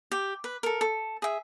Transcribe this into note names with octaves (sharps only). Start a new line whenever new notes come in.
G4
B4
A4 A#4
A4
G#4 E5